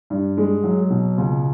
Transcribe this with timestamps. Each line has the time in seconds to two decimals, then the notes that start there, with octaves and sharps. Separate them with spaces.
0.10 G2
0.37 G#3
0.64 F#3
0.90 B2
1.18 C#2